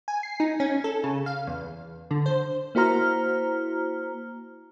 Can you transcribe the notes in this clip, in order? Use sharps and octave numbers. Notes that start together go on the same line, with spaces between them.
G#5
C7
D#4
C#4
A4
C#3
F5
E2
D3
C5
A#3 E4 F#4 C5 A#5 F6